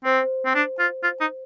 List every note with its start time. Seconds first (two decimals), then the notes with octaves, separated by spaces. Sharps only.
0.05 C4 C5
0.46 C4
0.55 D4
0.79 F4
1.04 F4
1.21 D#4